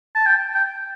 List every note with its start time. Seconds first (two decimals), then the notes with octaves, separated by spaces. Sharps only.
0.15 A5
0.26 G5
0.55 G5